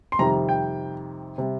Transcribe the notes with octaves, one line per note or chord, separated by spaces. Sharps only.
C6
F2 C3 D#3 G3 A#5
G5
C3 G3